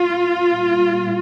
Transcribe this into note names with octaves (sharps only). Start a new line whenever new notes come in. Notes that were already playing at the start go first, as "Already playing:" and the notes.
Already playing: F4
A#2 G3